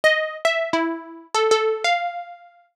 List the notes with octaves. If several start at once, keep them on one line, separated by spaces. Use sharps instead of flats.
D#5
E5
E4
A4
A4
F5